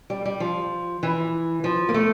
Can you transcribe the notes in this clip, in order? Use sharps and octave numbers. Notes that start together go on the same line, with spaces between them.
G3
G3
F3
E3
F3
A#3
A3